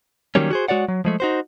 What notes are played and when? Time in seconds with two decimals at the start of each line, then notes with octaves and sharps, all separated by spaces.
0.35 D#3 F#3 G3 A#3 C#4
0.51 F#4 G#4 C5
0.68 G#3 F#4 C#5 D5 F#5
0.88 F#3
1.05 F3 G#3 A3
1.20 D#4 F#4 C5